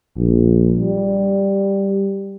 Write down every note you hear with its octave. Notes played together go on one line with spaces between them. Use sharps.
A#1
G3